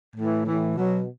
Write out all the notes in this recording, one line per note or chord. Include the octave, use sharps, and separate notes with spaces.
A2 E3
A2 E3
B2 F#3